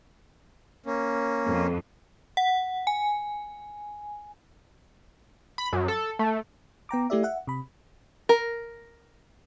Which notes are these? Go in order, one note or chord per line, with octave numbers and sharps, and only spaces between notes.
A#3 C#4
F2
F#5
G#5
B5
F#2
A4
A3
B3 G5 A#5 D6
A3 E4 G4 D5 E5
E5 F#5
C3 B5
A#4